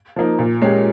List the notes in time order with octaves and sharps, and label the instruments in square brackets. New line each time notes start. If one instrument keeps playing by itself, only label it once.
[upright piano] F3 A#3 D#4
A#2
G#3 C#4 G4